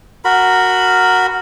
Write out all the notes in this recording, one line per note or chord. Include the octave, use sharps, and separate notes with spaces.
F#4 A#4 B5